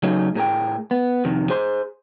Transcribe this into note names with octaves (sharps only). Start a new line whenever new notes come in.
C#3 F#3 A3 C#4 D#4 G#4
A2 G#4 A#4 G5
B3
F2 C3 D#3
G#4 C5 C6